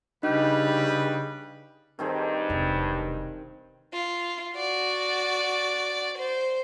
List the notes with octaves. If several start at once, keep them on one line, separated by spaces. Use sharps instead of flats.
C#3 G3 D4 D#4 G4 B4 D#5
G2 D#3 C4 G#4
E1 C3
F4
F#4 D5
C5